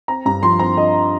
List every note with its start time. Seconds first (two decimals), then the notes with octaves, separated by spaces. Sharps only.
0.08 C4 A#5
0.25 G2 A#5
0.43 F3 C6
0.59 C4 A#5
0.77 F3 D#5